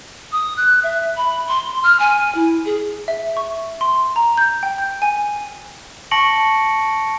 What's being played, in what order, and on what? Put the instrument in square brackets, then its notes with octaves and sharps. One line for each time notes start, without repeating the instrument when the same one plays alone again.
[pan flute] D#6
F#6
E5
B5
C6
F6
G#5
E4
G#4
[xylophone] E5
C#6
C6
A#5
G6
G5
G6
G#5
[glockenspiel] A5 C#6 A#6 C#7 D7 F#7